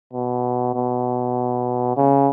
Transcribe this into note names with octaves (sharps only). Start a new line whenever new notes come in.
B2
B2
C#3